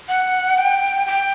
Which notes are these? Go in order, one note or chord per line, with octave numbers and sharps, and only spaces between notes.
F#5
G5
G5